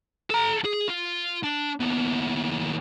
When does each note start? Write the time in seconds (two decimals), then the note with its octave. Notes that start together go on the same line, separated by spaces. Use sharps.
0.30 A4 A#5
0.65 G#4
0.88 F4
1.43 D4
1.80 D#2 B3